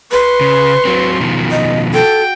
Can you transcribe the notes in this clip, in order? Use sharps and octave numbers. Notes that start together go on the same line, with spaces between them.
B4 C6 C#6
C#3
F#3 C4
B2 D#3 F3
D#5
F#4 A4 G5